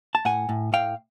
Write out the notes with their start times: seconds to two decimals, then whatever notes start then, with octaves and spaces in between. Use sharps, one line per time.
0.15 A5
0.25 A2 F#5 G#5
0.49 A2
0.73 A2 F5 G5